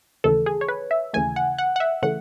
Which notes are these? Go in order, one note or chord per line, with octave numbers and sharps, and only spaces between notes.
D#2 C#3 E3 A3 A4
G#4
C#5
B4
E5
D#2 C#3 E3 A3 G#5
F#5
F#5
F#5
E5
C#3 E3 A3 F#5